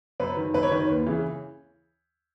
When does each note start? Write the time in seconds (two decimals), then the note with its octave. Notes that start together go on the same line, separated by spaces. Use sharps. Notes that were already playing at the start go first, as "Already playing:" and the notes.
0.20 F#2 B4
0.37 D#3
0.54 F#2 B4
0.63 C#5
0.71 D#3 B4
0.89 D#2
1.07 C#3 E3